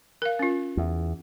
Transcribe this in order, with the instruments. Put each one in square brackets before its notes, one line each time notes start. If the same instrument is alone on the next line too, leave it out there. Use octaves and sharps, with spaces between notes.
[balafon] A#4 F5
C#4 F4
[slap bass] E2